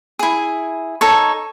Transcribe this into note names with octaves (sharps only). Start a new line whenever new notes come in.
E4 G#4
D#4 A4 C#5